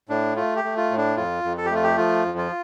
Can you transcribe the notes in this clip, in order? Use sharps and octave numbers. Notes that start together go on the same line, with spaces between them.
A2 D4
A3 F4
G4
A3
F4
A2
D4
F2 F4
F2
A4
G4
A3 F4
G4
F3 F4
F2
F4